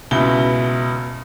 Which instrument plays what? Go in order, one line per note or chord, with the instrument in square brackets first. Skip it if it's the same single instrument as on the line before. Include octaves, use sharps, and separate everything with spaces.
[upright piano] C#2 B2 E4 B5 G7